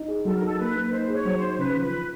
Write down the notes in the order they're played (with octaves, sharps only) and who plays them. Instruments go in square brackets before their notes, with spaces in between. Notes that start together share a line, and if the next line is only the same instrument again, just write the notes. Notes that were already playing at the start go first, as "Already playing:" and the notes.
Already playing: [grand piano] D#4
G#4
[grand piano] F#3 [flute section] A4
[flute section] A#4
[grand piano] D#4 [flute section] A4
[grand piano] A#3 [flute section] B4
[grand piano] A#3
[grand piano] D#4 [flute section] C5
[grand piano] G#4
[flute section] C#5
[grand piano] F#3
[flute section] C5
[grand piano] D#4
[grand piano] C#3 [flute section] B4
[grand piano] F3
[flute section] B4